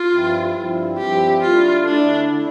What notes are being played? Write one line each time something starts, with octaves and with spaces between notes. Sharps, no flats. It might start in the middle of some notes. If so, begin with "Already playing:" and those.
Already playing: F4
G2 F3 C4 E4
G2 F3 C4 E4
G2 F3 C4 E4 G4
D3 A3 E4 F4
D3 A3 D4 E4
D3 A3 E4